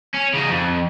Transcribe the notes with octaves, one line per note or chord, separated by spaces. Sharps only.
C#4
C#3 D#4
F2